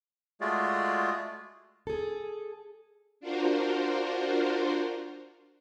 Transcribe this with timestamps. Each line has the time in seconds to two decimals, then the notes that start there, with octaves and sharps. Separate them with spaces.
0.41 G#3 A3 F4 F#4 G#4 D5
1.87 G#4 A4
3.20 D4 F4 F#4 A#4 C5